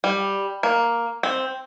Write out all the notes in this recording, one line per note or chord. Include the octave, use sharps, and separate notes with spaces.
G3
A#3
C4